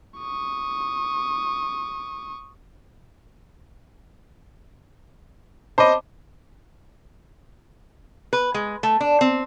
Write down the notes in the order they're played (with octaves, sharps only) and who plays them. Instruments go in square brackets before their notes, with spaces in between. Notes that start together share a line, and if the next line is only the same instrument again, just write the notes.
[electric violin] C#6 D#6
[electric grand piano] C5 D#5 [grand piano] A5 B5 D6
[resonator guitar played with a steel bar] B4
G#3
A3
D4
C4